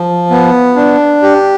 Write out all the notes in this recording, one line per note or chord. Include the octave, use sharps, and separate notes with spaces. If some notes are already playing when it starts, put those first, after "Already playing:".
Already playing: F3
B3
D4
G4